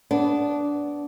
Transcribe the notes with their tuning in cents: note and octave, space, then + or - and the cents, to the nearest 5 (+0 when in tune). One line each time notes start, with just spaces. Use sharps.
B3 +0 D4 -15